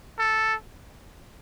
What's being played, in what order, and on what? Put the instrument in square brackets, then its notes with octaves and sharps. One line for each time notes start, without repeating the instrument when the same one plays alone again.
[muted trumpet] A4